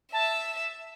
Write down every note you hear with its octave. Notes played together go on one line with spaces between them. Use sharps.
E5 A5